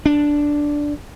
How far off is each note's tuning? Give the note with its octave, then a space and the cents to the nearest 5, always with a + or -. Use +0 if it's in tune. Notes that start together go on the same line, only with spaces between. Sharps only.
D4 -5